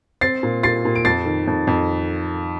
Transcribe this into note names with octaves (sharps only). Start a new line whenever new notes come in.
C4 A6 C7
A#2
A#2 A6 C7
A#2
D7
F2 A6 C7
D#3
F2
F2